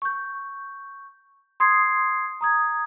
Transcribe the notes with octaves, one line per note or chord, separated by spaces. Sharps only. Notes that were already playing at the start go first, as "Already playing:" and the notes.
C#6 G6
C6 D#6 G#6 C7
A#5 D#6 G#6